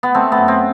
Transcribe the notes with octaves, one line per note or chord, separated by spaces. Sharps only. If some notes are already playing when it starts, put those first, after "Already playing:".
B3
A3 C4
B3
F#2
C4